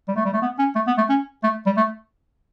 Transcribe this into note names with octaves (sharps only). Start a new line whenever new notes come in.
G3
A3
G3
A3
B3
C#4
A3
B3
A3
C#4
A3
G3
A3